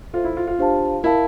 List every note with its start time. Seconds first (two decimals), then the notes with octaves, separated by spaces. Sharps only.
0.13 F4 A4 C5 E5
0.24 E4
0.37 F4
0.47 F4
0.59 D4 G4 C5 F5 A5
1.03 E4 A#4 F5 A5